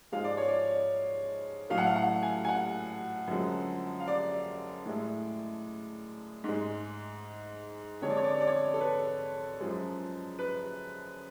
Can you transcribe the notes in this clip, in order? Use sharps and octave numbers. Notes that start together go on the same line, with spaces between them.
G#2 F3 G#3 F5
D5
C#5
D5
A2 F#3 A3 F5
F#5
F5
F#5
G#5
G#5
F#5
F#2 D3 F3 G#3
F5
D5
A2 G#3
G#2 G#3
F2 D3 G#3 C#5
D5
C#5
D5
C#5
D5
C#5
A4
B4
F#2 F3 G#3
B4